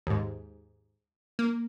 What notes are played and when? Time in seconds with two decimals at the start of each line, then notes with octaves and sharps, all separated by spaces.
0.07 D#2 G#2
1.39 A#3